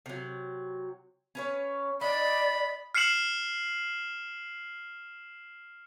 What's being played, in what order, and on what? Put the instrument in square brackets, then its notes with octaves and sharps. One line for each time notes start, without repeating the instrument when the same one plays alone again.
[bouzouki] C3 F#3
C#4 B4 C#5
[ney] D5 [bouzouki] D#5 [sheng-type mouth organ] B5
[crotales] F6 C7 C#7 E7 F#7